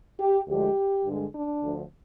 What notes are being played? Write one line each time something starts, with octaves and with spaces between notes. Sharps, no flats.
G4
D2 D3 F3 G#3 G4
G2 D3 G#3
D4
D2 D3 F3